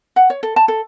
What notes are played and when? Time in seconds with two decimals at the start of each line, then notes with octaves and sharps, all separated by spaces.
0.16 F#5
0.30 C#5
0.43 A4
0.56 A5
0.68 A4